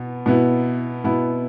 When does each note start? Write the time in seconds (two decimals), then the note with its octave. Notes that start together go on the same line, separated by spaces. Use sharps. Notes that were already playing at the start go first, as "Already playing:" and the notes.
Already playing: B2 B3
0.26 B2 B3 E4
1.04 B2 B3 E4